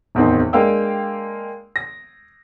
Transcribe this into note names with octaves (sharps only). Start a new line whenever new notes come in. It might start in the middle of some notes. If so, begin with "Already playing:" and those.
D1 E2 D#3 C4 D#4
G#3 A#3 D4 F5 G5 E6
A#6